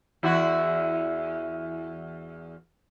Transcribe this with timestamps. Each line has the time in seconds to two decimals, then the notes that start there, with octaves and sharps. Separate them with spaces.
0.23 E2 E4 F#4